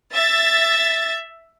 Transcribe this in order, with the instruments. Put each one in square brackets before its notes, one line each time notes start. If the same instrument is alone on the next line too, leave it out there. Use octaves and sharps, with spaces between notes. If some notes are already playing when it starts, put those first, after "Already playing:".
[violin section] E5 A6